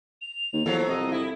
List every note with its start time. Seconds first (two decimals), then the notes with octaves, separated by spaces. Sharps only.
0.21 F7
0.53 D#2
0.66 E2 F3 F#3 A4
0.88 C2 D#5
1.12 E4